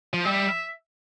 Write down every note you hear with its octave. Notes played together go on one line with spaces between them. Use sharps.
F3
G3 E5